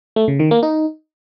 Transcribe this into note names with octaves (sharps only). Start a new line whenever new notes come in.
A3
C#3
D#3
A#3
D#4